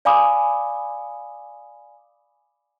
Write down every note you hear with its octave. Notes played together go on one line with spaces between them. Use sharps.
D5 F5 G#5 B5 D6 D#6